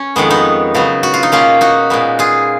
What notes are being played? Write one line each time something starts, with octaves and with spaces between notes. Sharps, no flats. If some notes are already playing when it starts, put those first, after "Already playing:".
Already playing: C#4
F2 D#3 G#3 B3
B3 D#4
C#3 F#3 B3
F#4
F4
D#4
B2 A#3 C#4 F4
D#4 F#4
A#2 G#3 B3
F4 G#4